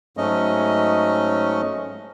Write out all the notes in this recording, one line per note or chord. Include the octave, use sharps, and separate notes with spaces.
G#2 F#3 A3 C#4 D#5